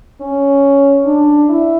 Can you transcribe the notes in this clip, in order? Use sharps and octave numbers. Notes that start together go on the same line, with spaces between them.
C#4
D4
E4